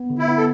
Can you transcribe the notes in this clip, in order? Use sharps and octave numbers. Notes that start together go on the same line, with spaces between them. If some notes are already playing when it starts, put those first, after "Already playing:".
Already playing: B3
D3
E4
B3
A4